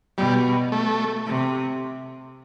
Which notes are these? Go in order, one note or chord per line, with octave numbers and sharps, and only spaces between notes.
B2 G3
A3
C3